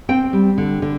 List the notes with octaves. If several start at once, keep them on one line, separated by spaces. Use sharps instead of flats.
C4 G5
G3
D3
D3